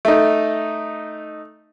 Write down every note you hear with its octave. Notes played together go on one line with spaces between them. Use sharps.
A3 D#4